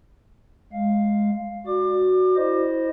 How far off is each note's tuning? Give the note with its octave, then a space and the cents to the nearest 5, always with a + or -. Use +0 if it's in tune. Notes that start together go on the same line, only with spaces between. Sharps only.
G#3 +0 F5 +0
F#4 +0 D5 +0 D6 +30
E4 -10 C5 +0 D#5 -10